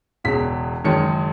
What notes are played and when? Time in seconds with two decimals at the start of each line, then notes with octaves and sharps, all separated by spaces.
0.24 E1 E2 C#3 B6
0.84 F#1 F#2 D#3 G#3 C#4 C#7